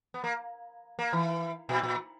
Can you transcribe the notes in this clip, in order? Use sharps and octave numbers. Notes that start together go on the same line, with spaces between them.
B3
A#3
A#3
E3
A#2
A#2